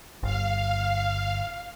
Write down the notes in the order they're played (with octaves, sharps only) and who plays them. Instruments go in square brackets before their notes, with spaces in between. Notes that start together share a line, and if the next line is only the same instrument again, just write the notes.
[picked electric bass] G1 [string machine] F5